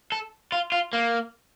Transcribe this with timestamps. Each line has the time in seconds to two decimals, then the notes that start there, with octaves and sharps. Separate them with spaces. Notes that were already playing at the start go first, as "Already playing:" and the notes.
0.12 A4
0.52 F4
0.72 F4
0.93 A#3